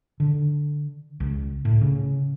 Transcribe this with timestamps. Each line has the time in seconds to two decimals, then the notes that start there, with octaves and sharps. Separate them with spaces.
0.20 D3
1.20 C#2
1.65 A2
1.81 C#3